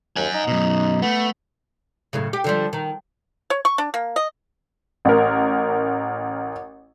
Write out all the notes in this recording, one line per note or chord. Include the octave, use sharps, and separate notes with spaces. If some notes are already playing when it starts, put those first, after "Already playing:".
D#2 F#5 G#5
D#4
F#2 B2
A3 B3
F#2 A2 C#3
G4
D3 F3 G3
D#3
C#5
C#6
D4
A#3
D#5
A1 A#4